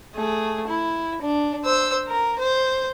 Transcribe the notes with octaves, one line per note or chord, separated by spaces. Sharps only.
A3 G#4
E4
D4
C5 E6
A#4
C5